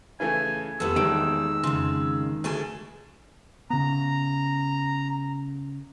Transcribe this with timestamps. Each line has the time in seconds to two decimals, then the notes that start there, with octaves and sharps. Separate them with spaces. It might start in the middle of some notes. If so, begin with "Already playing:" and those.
0.20 C#3 E3 A3 G#5
0.80 F2 G3 B3 A4 E6
0.96 D#1 E2 D#3 G#3 A5 D7
1.63 F2 C#3 C6
2.44 D2 G#4 A4 G#5
3.70 C#3 B3 A#5